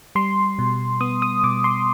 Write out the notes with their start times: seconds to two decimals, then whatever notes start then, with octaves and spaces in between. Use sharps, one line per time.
0.15 G3 C6
0.59 B2
1.00 B3 D#6
1.22 D#6
1.43 B2 D6
1.64 C6